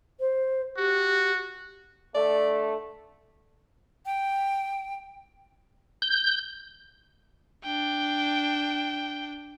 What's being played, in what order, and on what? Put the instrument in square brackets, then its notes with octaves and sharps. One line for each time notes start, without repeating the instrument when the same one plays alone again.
[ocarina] C5
[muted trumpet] F#4 [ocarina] G4
[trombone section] D3 A3 [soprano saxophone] D5
[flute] G5
[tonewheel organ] G6
[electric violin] D4 G5